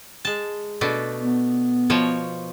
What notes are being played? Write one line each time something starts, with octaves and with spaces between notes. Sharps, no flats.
G#3 A5
B2 A3 D4
B3
B2 F3 C#5